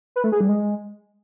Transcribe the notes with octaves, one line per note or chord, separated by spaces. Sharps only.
B4
A3
G#4
G3
G#3